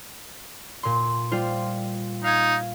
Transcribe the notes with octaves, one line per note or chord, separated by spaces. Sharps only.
A#2 C6
G3 F4 C5
D#4 F5 G#6